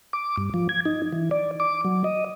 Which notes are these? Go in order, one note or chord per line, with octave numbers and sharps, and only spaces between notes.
D6
G2
F3
G#6
D#4
E3
D5
D6
F#3
D#5